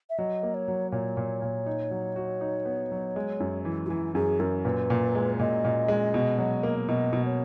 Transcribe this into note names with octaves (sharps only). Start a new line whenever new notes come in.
E5
F#3 D#5
A#3
C#5
F#3
A#2 C#5
A#2
A#2
D#4
F#3
F#4
D#4
B3
F#3
G#3
F#2
E3
F#4
E3 E4
F#2 G#4
F#2 A#4
A#2 B4
A#2
G#3
A#2 D#5
A#2
G#3
B2
F#3
A#3
B2 D#5
B2
C#5